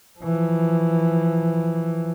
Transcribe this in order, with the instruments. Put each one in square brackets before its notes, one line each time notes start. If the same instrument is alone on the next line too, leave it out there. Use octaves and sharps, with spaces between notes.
[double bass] E3 F3